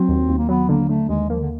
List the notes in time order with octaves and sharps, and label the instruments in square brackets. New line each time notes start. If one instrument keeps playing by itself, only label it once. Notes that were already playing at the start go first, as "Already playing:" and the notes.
Already playing: [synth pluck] F#3 [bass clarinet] C4
[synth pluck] D#2
D#2
[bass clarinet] A#3
[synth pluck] F#3 [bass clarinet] B3
[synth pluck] D3 [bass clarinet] A#3
[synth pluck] D3 [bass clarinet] A3
[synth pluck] D#2 [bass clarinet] G#3
[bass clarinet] F3 [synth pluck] A#3
[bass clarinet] D3